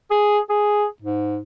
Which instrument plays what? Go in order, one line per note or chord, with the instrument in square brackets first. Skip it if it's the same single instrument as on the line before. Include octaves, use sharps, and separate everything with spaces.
[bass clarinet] G#4
G#4
G#2